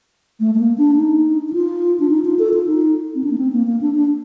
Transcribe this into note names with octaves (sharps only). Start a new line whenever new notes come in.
A3
A3
A#3
D4
D#4
D#4
F4
D4
D#4
F4
A4
F4
D#4
C4
D4
A#3
C4
A#3
A#3
D4
D4